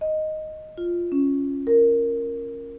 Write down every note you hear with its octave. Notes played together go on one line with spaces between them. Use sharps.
D#5
F4
C#4
A#4